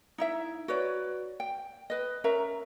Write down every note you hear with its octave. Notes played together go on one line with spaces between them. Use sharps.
D#4 E4 E5
F#4 B4 C#5 D5
G5
B4 D#5
C#4 A#4 E5 A#5